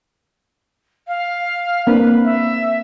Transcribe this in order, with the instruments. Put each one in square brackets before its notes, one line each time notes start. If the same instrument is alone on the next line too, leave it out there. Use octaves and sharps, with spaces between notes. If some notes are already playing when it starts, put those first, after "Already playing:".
[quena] F5
[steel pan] A#3 C4 D4 [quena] B4
[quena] E5